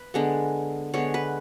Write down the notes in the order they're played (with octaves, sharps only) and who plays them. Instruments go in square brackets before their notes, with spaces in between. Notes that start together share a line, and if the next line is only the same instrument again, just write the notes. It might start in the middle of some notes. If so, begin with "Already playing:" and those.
Already playing: [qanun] B4
D3 G#3 B3
D3 G#3 B3 C#5
B4